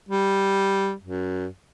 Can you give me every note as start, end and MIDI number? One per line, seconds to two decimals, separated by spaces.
0.09 0.93 55
1.04 1.46 42